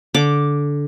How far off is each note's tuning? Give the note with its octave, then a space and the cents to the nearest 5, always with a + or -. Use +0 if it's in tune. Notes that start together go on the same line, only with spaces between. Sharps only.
D3 -15 D6 +0